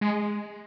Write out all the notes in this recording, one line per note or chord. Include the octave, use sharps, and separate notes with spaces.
G#3